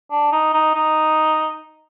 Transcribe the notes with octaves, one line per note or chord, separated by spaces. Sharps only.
D4
D#4
D#4
D#4